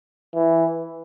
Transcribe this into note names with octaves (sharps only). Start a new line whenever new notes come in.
E3